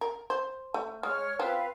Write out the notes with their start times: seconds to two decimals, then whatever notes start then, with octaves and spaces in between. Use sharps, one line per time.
0.01 A#4
0.30 C5
0.74 A3
1.03 G#3 C#5 F6
1.39 C4 F4 B4 F5